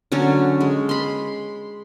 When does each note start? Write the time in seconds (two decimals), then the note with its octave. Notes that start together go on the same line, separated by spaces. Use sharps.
0.12 D3 F#3 C#4
0.61 G#3
0.89 B5 C6